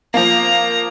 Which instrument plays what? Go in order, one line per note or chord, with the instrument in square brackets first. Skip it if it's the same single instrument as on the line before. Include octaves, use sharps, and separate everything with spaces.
[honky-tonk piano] F3 A#3 [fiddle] A#5